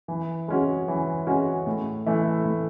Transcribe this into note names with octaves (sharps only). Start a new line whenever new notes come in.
E3
G#3 C#4 F#4
E3
G#3 C#4 F#4
A2
E3 A3 E4
A2